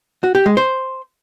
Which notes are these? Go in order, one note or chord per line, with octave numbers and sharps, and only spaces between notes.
F#4
G4
G#3
C5